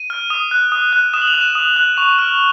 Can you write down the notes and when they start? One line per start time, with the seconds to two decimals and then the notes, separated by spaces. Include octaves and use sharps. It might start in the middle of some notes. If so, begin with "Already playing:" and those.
Already playing: D#7
0.10 F6
0.30 D#6
0.51 F#6
0.72 D#6
0.93 F#6
1.13 D#6 E7
1.22 F#7
1.28 F7
1.34 F#6
1.41 E7
1.55 D#6
1.76 F#6
1.97 C#6 F7
2.18 F6